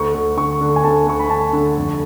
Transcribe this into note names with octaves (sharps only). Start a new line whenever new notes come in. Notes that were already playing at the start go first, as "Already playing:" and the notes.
Already playing: D2 C#6
D2
D3 C#6
D3
G#5
D2 A5
D2 C#6
B5
D3 A5
D3
F1